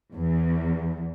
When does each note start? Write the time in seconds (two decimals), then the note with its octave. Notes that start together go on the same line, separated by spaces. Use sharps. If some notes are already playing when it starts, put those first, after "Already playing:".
0.13 E2